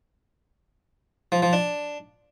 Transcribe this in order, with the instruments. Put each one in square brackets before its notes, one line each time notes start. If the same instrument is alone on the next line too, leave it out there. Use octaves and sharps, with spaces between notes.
[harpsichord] F3
F3
D4